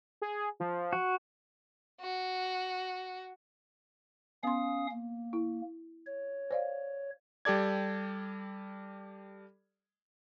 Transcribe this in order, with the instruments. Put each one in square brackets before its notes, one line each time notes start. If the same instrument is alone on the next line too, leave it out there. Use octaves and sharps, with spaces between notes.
[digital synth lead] G#4
F3
[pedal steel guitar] F#4
[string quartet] F#4
[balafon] B3 C6 [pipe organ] C#4 F5 D#6
[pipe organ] A#3
[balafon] E4
[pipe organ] C#5
[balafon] C5 D5 F5
[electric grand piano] G3 G4 A4 D5 G#6